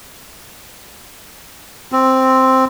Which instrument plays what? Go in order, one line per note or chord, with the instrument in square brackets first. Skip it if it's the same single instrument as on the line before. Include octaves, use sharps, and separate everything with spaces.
[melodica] C4